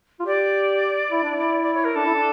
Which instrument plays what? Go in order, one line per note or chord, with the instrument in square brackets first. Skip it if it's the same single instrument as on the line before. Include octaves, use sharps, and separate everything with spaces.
[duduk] F4
[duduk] G4 [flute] D5
[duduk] E4
D4
E4
[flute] D5
C#5
A#4
[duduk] D4 [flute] A4
[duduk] E4
D4